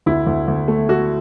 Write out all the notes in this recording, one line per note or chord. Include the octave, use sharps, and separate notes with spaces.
D2 E4
D2
D2
A3
A3 F#4